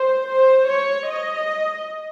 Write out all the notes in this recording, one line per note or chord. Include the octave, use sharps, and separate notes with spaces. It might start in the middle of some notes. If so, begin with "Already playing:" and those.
Already playing: C5
C5
C#5
D#5